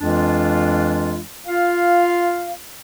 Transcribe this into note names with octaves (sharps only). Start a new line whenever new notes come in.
F2 E3 G#3 D4 F4
F4 F5